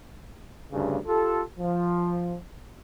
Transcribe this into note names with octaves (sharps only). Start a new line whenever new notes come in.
D2 G2 C#3
F4 G4 A4
F3